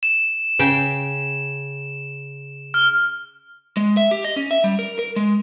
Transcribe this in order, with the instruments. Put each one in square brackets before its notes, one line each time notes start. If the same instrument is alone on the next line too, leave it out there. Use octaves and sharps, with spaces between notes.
[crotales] E7
[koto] C#3 G5
[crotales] F6
[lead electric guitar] G#3
E5
G4
D#5
C#4
E5
G3
A#4
A#4
G#3